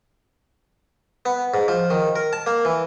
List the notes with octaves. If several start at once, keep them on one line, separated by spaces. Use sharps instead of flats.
B3
G#2
F3
D#3
A#4
A5
A#3
E3